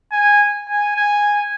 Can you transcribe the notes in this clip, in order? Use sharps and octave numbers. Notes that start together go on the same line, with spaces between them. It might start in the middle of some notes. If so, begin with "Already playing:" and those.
G#5
G#5
G#5